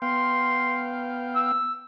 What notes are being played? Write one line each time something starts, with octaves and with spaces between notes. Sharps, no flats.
B3 F5 G5 C6
E6